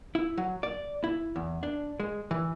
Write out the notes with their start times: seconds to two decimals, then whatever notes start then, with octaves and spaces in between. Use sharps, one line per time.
0.15 E4
0.38 F#3
0.63 D5
1.04 E4
1.36 E2
1.63 D4
2.00 G#3
2.31 E3